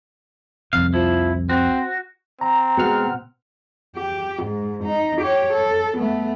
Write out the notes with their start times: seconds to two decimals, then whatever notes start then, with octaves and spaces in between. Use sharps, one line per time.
0.73 C2 F2 C3 F5
0.94 F3 E4
1.49 C4 F#4
2.41 C4 A#5
2.78 B2 G#3 B3 F#5 F6
3.96 G4
4.43 G#2
4.84 D#4
5.21 G4 C#5
5.54 A4
5.98 A3 B3